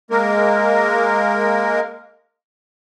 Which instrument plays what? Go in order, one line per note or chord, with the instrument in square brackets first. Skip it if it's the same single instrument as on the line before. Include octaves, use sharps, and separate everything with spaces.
[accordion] G#3 A#3 A#4